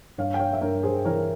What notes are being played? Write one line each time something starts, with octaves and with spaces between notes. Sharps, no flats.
G2 C#5 F5
G5
C#5 F5
E5
G2 A#4 C#5
G#4 C5
E3 A#4 C#5